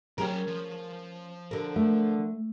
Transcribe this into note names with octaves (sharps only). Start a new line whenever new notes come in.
F#3 C#4 G#4 A#4 G5
F3
D3 A#4
A3